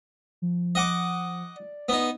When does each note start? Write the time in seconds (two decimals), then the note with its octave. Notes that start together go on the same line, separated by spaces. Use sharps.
0.42 F3
0.75 D#5 F#5 D6
1.56 D5
1.89 B3 D#4